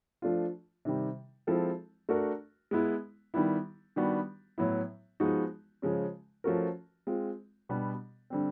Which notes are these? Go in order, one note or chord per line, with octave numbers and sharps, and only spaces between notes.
F3 A3 D4 F4
C3 D#3 G3
F3 G#3 C4 E4 A4
A3 D4 F#4 A#4
G#3 B3 E4
D#3 G3 B3 E4
D#3 G3 B3 D4 F#4
A2 F#3 B3 E4
F3 G#3 B3 D#4 F#4
C#3 F3 G#3 C#4
F3 A3 C#4 F#4 A#4
G#3 C4 F4
B2 G3 B3 D4
D3 G3 C4